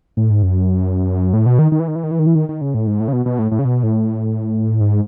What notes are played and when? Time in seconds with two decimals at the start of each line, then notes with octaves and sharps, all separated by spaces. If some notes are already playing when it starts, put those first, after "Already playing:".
0.17 A2
0.30 G#2
0.43 F#2
1.33 A2
1.46 B2
1.59 D#3
1.72 D#3
1.80 E3
1.88 D#3
1.95 E3
2.03 D#3
2.11 E3
2.19 D#3
2.27 E3
2.35 D#3
2.49 D#3
2.61 C#3
2.74 A2
2.87 G#2
3.00 A2
3.08 C#3
3.13 B2
3.26 B2
3.39 A2
3.51 A2
3.59 C#3
3.65 B2
3.83 A2
4.80 G#2